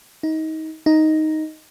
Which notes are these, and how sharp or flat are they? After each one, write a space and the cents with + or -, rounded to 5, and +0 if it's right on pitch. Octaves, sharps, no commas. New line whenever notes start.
D#4 +25
D#4 +5